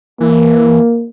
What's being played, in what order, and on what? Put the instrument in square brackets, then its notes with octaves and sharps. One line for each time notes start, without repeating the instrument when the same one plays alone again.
[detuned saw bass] E3 [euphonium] A#3